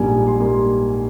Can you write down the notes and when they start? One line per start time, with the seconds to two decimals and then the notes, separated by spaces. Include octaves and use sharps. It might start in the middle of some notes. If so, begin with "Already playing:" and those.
Already playing: A#1 G#2 G3 A#3 G#5
0.27 C6
0.39 G3 A#3 C6